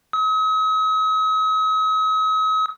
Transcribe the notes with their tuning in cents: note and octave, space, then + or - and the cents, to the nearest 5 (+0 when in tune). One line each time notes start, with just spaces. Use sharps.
D#6 +45